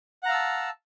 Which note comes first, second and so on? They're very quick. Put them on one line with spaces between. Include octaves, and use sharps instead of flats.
F#5 A#5 F5 E6 A5